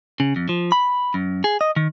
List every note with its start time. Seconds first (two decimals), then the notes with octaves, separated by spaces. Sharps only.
0.20 C#3
0.36 F2
0.49 F3
0.72 B5
1.14 F#2
1.44 G#4
1.61 D#5
1.76 D#3